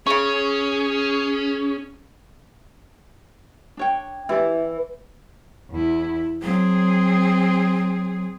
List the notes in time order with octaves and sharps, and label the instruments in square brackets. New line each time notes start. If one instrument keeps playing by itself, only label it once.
[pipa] C#3 C#6 [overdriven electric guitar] C#4 [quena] G#4
[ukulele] D4 C#5 G5
[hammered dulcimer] E3 [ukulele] E4 G4 D5
[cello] E2 E4
[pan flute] F#3 [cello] C4 G#4